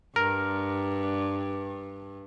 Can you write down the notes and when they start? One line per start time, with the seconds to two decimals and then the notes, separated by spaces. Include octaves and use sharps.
0.16 G2 A#4